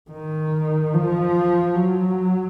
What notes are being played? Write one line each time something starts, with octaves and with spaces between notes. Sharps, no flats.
D#3
F3
F#3